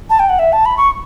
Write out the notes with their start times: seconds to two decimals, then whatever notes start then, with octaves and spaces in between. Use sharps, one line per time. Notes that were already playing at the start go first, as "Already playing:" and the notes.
0.10 A5
0.19 G5
0.29 F#5
0.39 E5
0.53 A5
0.65 B5
0.77 C#6